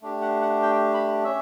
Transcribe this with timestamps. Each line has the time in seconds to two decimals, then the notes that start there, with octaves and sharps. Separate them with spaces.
0.02 A3 D4 G4
0.21 F#5
0.42 F#5
0.62 G5
0.94 B5
1.24 C#4 E5